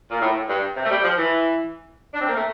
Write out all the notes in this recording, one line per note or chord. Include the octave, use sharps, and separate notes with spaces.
A#2
A2
G2
C3
A3
G3
F3
E3
D4
C4
A#3
A3